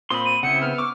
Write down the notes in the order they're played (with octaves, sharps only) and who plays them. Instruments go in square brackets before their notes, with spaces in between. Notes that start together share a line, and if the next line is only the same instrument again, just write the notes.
[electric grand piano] A#2 C4 D#6 [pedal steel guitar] B5 C6
[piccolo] D#7
[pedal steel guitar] C#3 C4 E4 [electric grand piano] F#5 [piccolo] C#7
[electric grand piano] B3 [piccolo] F6
[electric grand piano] C#6 E6 [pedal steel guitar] D6